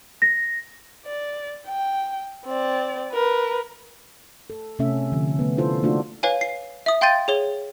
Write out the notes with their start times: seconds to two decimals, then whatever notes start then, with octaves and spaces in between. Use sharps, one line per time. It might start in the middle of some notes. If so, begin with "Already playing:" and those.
0.22 A#6
1.06 D5
1.67 G5
2.46 C4 D5
3.12 A#4 B4
4.50 A4
4.79 C3 A3 C#4 A4 E5
5.12 D3 F3
5.39 A3 B3
5.57 D4 E4 F4 A4 C5
5.83 A3 A#3 D4 D#4 F4 F#4
6.23 B4 C#5 F5 G#5
6.41 C7
6.86 E5 D#6
7.01 F5 G5 C6 G6 A6 D#7
7.28 G#4 C#5 G7